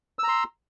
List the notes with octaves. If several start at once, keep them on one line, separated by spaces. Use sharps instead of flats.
A#5 C6 E6